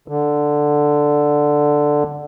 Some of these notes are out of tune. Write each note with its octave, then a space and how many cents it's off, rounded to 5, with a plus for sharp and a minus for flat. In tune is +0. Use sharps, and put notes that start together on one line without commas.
D3 +5